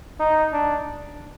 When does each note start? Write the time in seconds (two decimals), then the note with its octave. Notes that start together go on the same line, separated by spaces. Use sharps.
0.20 D#4
0.53 D4